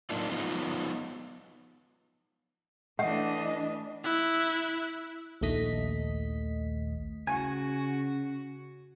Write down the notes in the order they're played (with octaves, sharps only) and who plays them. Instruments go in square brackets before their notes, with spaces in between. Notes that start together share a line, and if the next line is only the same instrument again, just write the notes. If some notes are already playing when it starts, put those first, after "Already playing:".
[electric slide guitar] A2 F#3 A#3 D4 D#4 F4
F3 B3 D#4 F4
[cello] E3 D4 [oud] A3 [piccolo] D#5 [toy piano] F#5
[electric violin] E4 F#6
[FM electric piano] A#1 D#2 A3 D#5 B6
[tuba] C#3 [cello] F#4 [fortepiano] G#5